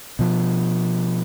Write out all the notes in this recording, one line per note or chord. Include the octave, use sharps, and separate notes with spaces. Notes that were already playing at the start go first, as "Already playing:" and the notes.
B2 F3